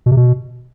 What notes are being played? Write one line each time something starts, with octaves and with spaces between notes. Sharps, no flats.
B2
C3
B2